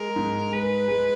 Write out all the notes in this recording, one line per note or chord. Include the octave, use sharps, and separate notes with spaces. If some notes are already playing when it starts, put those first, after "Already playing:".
Already playing: G#3 A#4
G#2
G#3 B4
G#3